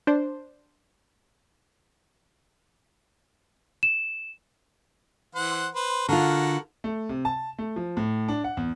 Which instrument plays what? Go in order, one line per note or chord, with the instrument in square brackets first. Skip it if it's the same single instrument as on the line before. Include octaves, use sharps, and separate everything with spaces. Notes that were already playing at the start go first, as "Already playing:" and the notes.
[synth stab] D4 C5
[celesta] E7
[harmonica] E3 C5 F#5
B4 C5
[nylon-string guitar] D3 F4 [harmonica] F#4 A4 A#4
[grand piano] A3
C3
A5
A3
F3
A2
D4
F#5
E2